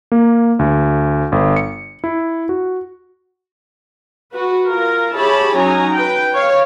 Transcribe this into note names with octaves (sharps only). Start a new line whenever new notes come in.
A#3
D2
G1
C#7
E4
F#4
F#4 B4
F4 A#4
E4 G4 G#4 C#5 A5 B5
F#3 C#4 D#4 G#5 A#5
B4 G5
C#5 F5